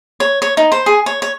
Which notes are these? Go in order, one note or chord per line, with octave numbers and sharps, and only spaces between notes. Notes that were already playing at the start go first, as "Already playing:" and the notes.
C#5
C#5
D#4
C5
G#4
C#5
C#5